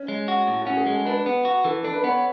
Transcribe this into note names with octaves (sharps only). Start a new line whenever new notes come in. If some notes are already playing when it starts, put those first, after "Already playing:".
Already playing: C#4
G#3
F#4
A2
C#4 F#4
G#4
G#3 A4
D4 B4
B3
F#4
E3 A4
A4
D4
B4
B3 C#5